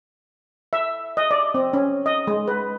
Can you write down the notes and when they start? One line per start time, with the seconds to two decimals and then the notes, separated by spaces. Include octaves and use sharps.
0.73 E5
1.17 D#5
1.31 D5
1.54 C4
1.73 C#4
2.06 D#5
2.27 G#3
2.48 B4